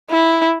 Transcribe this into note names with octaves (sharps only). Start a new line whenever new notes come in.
E4